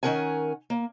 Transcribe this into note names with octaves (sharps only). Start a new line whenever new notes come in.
D#3 C#4 A#4 F#5 G#5
A#3